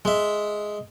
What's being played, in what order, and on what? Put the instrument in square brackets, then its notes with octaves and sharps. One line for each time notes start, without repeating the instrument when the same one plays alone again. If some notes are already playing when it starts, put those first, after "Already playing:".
[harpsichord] G#3 E5